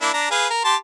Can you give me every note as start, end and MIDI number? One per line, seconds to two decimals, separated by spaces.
0.01 0.09 58
0.01 0.09 62
0.01 0.09 64
0.14 0.27 62
0.14 0.27 82
0.31 0.47 68
0.31 0.47 71
0.31 0.47 77
0.50 0.61 70
0.64 0.75 67
0.64 0.75 81
0.64 0.75 84